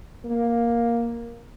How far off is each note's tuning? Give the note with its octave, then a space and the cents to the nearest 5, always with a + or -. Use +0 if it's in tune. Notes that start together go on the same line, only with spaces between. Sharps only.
A#3 +5